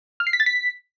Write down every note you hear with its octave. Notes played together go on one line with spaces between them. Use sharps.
F6
C7
B6
A6
B6